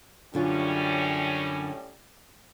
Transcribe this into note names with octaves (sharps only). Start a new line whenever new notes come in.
F#2 A2 D3 G3 C#4 F4